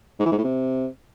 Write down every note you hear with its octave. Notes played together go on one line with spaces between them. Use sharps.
G#2
E3
G#2
A2
C3